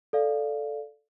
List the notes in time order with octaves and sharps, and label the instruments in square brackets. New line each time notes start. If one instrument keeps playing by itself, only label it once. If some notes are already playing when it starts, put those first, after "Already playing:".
[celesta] A4 D5 F5